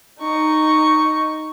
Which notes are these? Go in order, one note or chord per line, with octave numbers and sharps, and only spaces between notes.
D#4 C#6